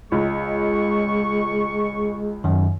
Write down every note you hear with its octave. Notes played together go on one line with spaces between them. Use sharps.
C#2 G#3 C#6
F#2 D#3